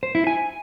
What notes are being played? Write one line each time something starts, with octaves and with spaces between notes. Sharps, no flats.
C5
E4
G#5